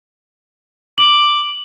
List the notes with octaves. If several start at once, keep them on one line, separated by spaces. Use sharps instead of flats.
D6 F#7